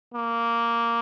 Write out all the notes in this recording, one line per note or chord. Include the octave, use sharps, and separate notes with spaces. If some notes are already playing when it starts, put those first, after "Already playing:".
A#3